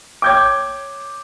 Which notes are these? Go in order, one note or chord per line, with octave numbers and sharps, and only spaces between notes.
C#5 G5 D6 G6 G#6